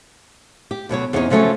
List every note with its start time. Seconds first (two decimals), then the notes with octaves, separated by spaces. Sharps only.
0.71 G4
0.89 D2 B2 F#3 C#5
1.13 E2 C4 C#4 D#4 A#4 C#5
1.30 C#3 F3 F#3 A3 C#4 C#5